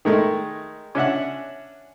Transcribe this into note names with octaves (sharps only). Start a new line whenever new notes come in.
D#3 G#3 A3
C#4 D4 E5 F#5